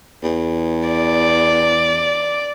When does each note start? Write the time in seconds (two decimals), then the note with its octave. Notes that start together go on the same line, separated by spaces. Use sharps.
0.23 E2
0.89 D5